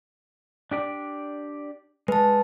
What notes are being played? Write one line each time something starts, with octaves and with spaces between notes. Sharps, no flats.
D4 G4 D5
G#3 B4 A5